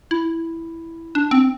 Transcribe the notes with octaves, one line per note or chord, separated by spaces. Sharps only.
E4
D4
C4